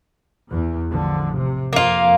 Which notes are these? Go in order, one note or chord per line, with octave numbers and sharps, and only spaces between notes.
E2 E3
A1 D3 F3
C3
F2 A#3 F4